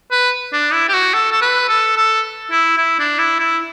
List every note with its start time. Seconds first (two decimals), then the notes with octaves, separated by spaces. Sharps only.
0.12 B4
0.53 D4
0.73 E4
0.89 G4
0.94 F#4
1.14 A4
1.32 A4
1.42 B4
1.69 A4
1.96 A4
2.51 E4
2.78 E4
2.99 D4
3.19 E4
3.40 E4